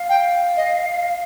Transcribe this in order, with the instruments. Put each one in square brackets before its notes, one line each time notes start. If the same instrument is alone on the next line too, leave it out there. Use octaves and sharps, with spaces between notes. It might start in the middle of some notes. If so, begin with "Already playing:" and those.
Already playing: [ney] F5
[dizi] G5
D#5